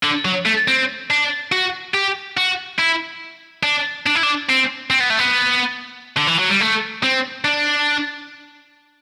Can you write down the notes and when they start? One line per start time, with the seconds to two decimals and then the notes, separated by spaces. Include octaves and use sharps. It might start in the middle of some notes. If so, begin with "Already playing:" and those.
0.03 D3
0.25 F#3
0.46 A3
0.68 C4
1.10 D4
1.52 F#4
1.94 G4
2.37 F#4
2.79 E4
3.63 D4
4.06 D4
4.15 E4
4.23 D4
4.49 C4
4.90 C4
5.00 B3
5.10 A3
5.19 B3
6.17 D3
6.28 E3
6.39 F#3
6.50 G3
6.61 A3
7.03 C4
7.45 D4